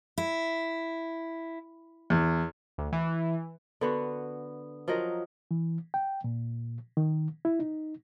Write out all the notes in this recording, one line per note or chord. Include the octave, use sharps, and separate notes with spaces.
E4
E2
D2
E3
D3 B3 F#4
F3 F#3 A#4 D#5
E3
G5
A#2
D#3
E4
D#4